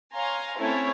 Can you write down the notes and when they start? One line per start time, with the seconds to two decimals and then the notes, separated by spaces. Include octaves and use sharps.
0.13 C#5 F5 G#5 A#5 C6
0.59 A3 C4 C#4 E4 A4 C#5